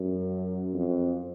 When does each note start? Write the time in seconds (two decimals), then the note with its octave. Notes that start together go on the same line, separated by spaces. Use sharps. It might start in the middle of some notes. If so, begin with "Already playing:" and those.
Already playing: F#2
0.73 F2